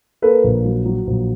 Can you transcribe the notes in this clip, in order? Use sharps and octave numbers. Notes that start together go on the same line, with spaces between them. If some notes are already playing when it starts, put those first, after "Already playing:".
A#3 A4 B4
A#1
F#3
F#3
A#1